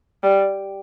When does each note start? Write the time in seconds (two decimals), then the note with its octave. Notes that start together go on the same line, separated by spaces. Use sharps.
0.23 G3